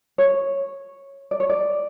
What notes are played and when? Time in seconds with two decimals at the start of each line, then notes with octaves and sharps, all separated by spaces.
0.18 C#5
1.31 D5
1.40 C#5
1.49 D5